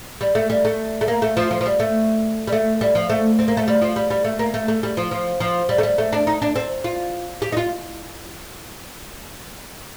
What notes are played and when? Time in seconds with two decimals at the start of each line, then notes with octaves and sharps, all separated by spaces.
0.21 G3
0.35 A3
0.50 G3
0.65 A3
1.01 A3
1.08 A#3
1.22 A3
1.37 F3
1.51 F3
1.61 F3
1.66 G3
1.80 A3
2.47 G3
2.52 A3
2.81 G3
2.95 F3
3.09 A3
3.39 C4
3.48 A#3
3.57 A3
3.68 G3
3.81 F3
3.96 G3
4.10 G3
4.24 A3
4.39 A#3
4.54 A3
4.68 A3
4.83 G3
4.97 F3
5.11 F3
5.40 F3
5.69 G3
5.78 A3
5.83 G3
5.98 A3
6.13 D4
6.27 D#4
6.42 D4
6.56 C4
6.84 F4
7.42 G4
7.52 D#4
7.57 F4